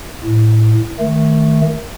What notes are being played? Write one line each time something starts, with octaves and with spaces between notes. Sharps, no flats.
A2
D#3 A3